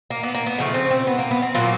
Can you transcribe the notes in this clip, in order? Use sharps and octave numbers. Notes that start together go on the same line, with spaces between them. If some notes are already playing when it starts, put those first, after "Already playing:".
A#3
B3
A#3
B3
C#3 F3 A3
C4
C4
B3
A#3
B3
C4
A#2 F#3 A#3 F4